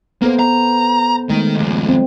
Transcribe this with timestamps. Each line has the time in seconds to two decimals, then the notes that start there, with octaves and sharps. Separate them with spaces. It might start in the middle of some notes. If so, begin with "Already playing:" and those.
0.22 A#3 B3 A4 C5
0.39 A#5
1.29 D#3 G#3 A3 A#4
1.57 D#2 F3
1.88 C4